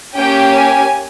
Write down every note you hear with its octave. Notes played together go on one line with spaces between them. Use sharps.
A#3 C#4 G4 G5
G#5